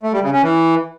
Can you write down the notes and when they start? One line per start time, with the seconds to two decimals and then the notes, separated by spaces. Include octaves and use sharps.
0.03 A3
0.13 G3
0.23 C#3
0.33 C#4
0.42 E3